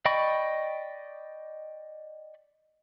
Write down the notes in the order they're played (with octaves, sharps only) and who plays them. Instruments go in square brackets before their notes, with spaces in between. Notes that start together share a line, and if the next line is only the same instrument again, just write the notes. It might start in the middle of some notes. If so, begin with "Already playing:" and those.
[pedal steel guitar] D5 D#5 G5 B5 C#6